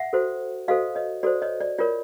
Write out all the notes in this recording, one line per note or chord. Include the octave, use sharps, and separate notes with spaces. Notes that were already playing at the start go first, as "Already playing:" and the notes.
Already playing: E5 F#5
F#4 A4 C5
F#4 A4 C5 D#5 F5
C#5 D#5
F#4 A4 C5 D5
C#5 D#5
D5
F4 A#4 C#5 D5